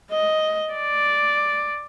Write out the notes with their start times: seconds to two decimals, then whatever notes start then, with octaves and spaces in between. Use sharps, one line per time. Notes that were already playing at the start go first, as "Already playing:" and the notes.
0.11 D#5
0.74 D5